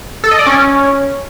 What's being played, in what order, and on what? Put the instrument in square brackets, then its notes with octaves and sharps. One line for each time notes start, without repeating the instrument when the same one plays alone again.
[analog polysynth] A4
D#5
D5
C#4